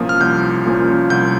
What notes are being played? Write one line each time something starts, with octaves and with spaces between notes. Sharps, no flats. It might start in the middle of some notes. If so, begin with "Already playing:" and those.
Already playing: C2 A#2 F3 A#3 C#4 D#6
F6
C2 G6
A#2 F3 A#3 C#4
C2 G6